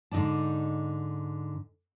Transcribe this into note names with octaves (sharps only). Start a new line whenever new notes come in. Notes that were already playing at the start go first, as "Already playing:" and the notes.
G#2 D3 D#4 D5 A5